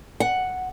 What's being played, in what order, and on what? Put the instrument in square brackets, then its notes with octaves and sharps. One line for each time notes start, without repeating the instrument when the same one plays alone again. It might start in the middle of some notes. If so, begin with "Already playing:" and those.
[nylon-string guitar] F#5